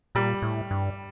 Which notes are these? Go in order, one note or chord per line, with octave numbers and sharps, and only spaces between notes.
A#2 G3
A2
G2